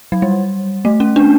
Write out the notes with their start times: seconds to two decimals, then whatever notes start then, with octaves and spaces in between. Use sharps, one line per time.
0.12 F#3
0.22 G3
0.85 A3
1.00 C#4
1.16 D4